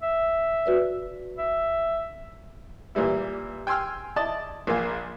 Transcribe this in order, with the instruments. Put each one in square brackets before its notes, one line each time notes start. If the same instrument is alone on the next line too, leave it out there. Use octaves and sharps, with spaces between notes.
[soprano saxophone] E5
[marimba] F#4 B4 D5
[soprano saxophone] E5
[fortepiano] A#2 E3 G3 E4
G5 G#5 C6 E6 F6
E4 D5 D#5 A5
A#1 A#2 A#3 F5 G#5